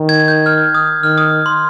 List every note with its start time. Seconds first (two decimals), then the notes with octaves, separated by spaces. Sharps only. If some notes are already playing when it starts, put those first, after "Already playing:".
Already playing: D#3
0.09 G#6
0.28 G6
0.46 F6
0.75 D#6
1.03 D#3 F6
1.18 D#6
1.46 C6